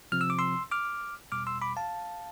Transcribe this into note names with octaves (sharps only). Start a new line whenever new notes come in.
C3 F3 C4 F6
E6
D6
C6 E6
D6 F6
E2 B2 G3 D6 F6
C6 E6
B5 D6
F5 A5